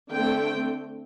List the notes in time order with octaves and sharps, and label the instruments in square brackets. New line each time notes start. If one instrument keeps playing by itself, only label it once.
[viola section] D3 A3 C4 G5